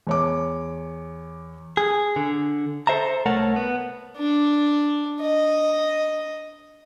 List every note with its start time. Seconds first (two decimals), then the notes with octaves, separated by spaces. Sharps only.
0.07 E2 C#5 D6
1.77 G#4
2.16 D3
2.87 A4 A#4 C5 E5 A5 A#5
3.26 C2 A3 A#4 C#5 F#5 A5
3.56 B3
4.17 D4
5.21 D#5